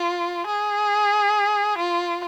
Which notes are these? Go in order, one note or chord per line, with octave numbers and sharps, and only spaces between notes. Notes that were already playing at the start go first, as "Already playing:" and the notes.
Already playing: F4
G#4
F4